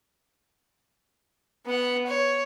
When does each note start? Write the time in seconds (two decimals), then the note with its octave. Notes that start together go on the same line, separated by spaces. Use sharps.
1.66 B3 F#5
2.07 C#5